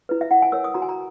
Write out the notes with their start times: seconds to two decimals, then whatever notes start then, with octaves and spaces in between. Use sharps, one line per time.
0.09 E4 B4
0.21 E5
0.31 E4 F#5
0.42 G#5
0.52 A#4 C#5 E6
0.64 D#6
0.74 F#4 A#5
0.82 G#5
0.89 A#5